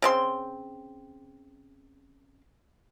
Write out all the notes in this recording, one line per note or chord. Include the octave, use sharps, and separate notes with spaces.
C#3 C4 C6